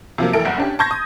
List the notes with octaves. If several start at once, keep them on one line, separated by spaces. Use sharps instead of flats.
C3 F3 F#3 A#3
A1 E4 A4 A#4 D7
F#1 C2 F#5
C#4 D4 G4
A5 C6 C#6 G6 G#6 A#6
D#6